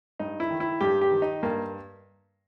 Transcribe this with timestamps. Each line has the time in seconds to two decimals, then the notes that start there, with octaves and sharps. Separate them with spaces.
0.19 G2 D#4
0.40 E4
0.51 D#3
0.60 E4
0.81 G2 G4
1.01 G4
1.11 D#3
1.22 D#4
1.43 G2 A#3